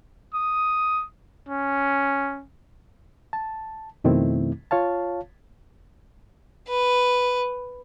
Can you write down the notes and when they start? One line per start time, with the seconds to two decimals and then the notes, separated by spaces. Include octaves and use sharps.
0.34 D#6
1.49 C#4
3.33 A5
4.04 F2 B2 D#3 A3 C4 E4
4.71 F4 C#5 F5 A5
6.68 B4